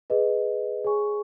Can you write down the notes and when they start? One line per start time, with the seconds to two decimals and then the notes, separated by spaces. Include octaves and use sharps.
0.10 G#4 B4 D#5
0.84 G#4 C#5 G#5 C#6